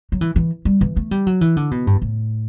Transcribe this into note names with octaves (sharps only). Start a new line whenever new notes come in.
F#3
E3
E3
G3
E3
A3
G3
F#3
E3
D3
B2
G2
A2